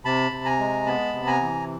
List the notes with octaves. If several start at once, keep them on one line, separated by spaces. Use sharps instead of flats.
C3 A5 B5
C3
G#5 A#5
G#3
B3 A5 B5
C3
G#5 A#5
E3